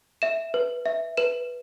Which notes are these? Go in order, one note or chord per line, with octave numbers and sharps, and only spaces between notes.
E5 E7
B4
E5
B4 E7